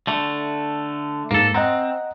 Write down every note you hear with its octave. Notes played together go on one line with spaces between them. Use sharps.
D3 A3
F2 G#2 A#3 A4
C4 D#5 F#5 A#5